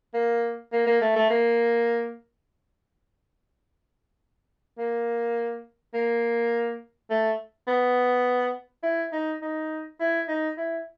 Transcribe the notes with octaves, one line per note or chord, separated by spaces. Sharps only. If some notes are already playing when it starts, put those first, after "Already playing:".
A#3
A#3
A#3
A3
A3
A#3
A#3
A#3
A3
B3
E4
D#4
D#4
E4
D#4
E4